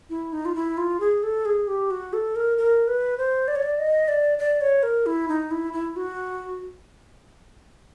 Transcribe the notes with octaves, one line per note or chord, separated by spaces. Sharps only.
E4
D#4
F4
E4
F4
G#4
A4
G#4
G4
F#4
A4
A#4
A#4
B4
C5
D5
C#5
D5
D#5
D5
D5
C#5
A#4
E4
D#4
E4
E4
F#4